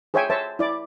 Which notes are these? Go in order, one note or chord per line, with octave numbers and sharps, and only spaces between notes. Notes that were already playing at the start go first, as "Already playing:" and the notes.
G#4 C5 C#5 E5 G5 G#5
C5 C#5 E5 A5
E4 D5 D6